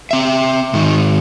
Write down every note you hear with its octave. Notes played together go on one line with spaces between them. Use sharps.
C4 E5
G#2 D#3